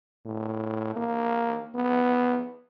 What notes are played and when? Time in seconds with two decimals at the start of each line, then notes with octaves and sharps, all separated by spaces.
0.26 A2
0.96 A#3
1.75 B3